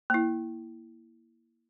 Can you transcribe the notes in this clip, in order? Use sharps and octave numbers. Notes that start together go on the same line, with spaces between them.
A#3 E4